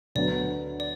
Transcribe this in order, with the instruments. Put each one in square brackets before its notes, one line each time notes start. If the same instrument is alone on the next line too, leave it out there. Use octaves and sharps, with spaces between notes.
[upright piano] D2 D3 F#3 B3 D4 [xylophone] D5
[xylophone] D5